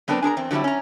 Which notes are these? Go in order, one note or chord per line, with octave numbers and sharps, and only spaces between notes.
F#3 B3 C4 D4 A#4 B4
D4 G#4 A#4 A#5
E2 C4
D3 F#3 G3 C4 E4
C#4 A#5